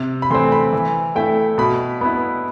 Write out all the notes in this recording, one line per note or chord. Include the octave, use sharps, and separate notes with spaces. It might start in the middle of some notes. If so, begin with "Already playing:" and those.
Already playing: C3
B5
E3 A3 C4 C6
B5
E3
A3 E4 G5
B2 B5
B3 E4 B5